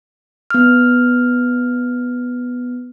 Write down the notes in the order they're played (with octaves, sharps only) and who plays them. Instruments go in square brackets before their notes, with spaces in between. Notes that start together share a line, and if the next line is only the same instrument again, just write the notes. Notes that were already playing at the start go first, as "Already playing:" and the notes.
[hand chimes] B3 F6